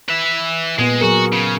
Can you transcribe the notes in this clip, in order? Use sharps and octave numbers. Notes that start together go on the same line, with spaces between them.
B4 E5
A#2 G#3 B3
F#3 F#4 G#4 A#4
C#3